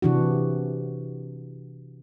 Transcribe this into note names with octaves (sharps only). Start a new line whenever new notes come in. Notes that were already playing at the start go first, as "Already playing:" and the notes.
C3 E3 D4 F#4